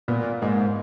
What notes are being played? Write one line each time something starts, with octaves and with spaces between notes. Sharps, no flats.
A#2 B3
G#2 A#3